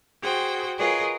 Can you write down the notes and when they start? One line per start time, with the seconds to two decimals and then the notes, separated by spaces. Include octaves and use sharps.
0.22 F#4 G#4 C5 G5
0.78 F4 G#4 A#4 B4 C#5 D#5